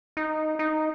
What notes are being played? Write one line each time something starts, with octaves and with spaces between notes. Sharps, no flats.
D#4
D#4